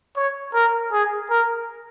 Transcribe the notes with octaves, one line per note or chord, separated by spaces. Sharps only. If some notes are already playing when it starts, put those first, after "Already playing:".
C#5
A#4
G#4
A#4